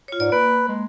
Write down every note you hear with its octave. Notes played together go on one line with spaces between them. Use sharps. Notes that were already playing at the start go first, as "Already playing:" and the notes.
F4 C#5
G#2 D5
A#3 B4
G#3